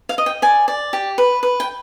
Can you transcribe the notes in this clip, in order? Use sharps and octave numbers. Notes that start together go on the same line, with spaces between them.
F5
D#5
G5
D5 G#5
D5
G4
B4
B4
G5